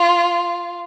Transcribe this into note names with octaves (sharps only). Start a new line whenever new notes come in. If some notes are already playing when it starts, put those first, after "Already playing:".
Already playing: F4